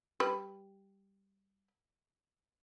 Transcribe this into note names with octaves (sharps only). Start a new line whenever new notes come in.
G3 B4